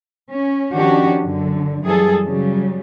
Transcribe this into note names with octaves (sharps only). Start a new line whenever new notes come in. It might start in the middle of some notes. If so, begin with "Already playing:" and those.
C#4
D#3 F3 C#4 D4 F#4 G4
F#2 D3
F#2 E3 G3 G#4 A4
C#3 F#3 G3